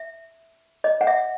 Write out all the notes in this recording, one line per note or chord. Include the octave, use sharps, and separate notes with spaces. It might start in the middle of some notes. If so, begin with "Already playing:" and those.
Already playing: E5
D#5
F#5
E5